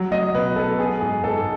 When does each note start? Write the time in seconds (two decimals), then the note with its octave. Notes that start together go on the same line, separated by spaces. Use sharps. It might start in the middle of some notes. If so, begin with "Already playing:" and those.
Already playing: F#3
0.11 F#3 D#5
0.34 B2 B4
0.56 B2 A4
0.79 B3 G#4
1.01 G#2 G#4
1.23 G#2 A4